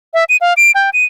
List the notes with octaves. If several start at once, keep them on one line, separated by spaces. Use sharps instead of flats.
E5
D#7
F5
D7
G5
D#7